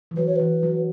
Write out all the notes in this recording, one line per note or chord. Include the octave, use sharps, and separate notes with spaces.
E3
F#3 B4
C#5
E3 B4
F#3